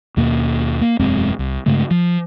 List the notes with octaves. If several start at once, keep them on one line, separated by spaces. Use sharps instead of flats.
D#2 B2 A#3
A#3
E1 F#2 G#3 C4
C2
G2 C#3 G#3 A3
F3